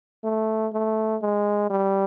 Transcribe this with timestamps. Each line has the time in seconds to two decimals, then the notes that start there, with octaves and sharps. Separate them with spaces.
0.24 A3
0.73 A3
1.22 G#3
1.70 G3